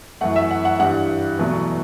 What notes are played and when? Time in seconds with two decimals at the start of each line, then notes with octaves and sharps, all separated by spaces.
0.21 F#2 E3 A3 F#5
0.36 E5
0.51 F#5
0.65 F#5
0.79 G2 E3 G3 F#5
1.39 E2 B2 F#3 A3